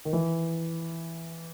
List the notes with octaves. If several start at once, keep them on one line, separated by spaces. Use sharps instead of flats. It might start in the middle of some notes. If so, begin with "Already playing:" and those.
D#3
E3